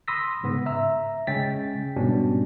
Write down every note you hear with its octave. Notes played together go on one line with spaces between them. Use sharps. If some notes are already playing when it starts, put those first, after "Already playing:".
B5 C6 D#6 E6 A#6 B6
G#2 C#3 B3
E5 A#5 E6
C#3 G#3 C#4 G5 A6 B6
G#2 B2 G3 B3 C#4 D4